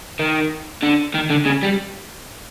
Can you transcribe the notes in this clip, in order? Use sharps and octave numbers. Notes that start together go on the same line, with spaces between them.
D#3
D3
D#3
D3
C#3
G3